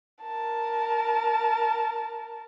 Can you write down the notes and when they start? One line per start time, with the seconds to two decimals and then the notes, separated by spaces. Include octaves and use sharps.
0.23 A#4 A5